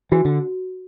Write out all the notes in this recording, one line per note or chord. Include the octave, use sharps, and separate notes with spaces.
E3 F#4
D3